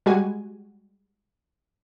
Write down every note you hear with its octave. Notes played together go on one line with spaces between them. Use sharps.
G3 G#3 F#4 G#5